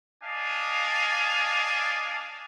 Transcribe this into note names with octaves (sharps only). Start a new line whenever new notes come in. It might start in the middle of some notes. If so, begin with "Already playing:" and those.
D4 D#5 F5 G#5